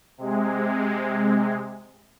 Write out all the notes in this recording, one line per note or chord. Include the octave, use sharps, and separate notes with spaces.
C3 G#3